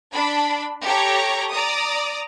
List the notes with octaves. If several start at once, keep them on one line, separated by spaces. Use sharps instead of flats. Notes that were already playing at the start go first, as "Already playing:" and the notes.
D4 B5
G4 A4 C#5 A#5
D5 A#5 D#6